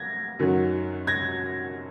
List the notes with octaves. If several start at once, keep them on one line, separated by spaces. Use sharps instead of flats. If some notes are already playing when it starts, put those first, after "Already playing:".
Already playing: G#6 A#6
F#2 D#3 F#3
G#6 A#6